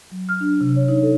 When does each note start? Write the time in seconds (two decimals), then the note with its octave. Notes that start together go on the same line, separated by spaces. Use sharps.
0.11 F#3
0.29 F6
0.41 D4
0.61 C3
0.76 C#5
0.89 D#4
1.03 A4